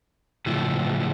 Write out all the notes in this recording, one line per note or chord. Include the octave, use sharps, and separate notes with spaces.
A2 C#3 F3 E4 F#4